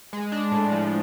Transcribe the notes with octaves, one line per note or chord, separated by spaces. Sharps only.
G#3
D4
A2
F3